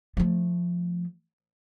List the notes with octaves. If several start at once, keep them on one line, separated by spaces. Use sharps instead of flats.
F3 A3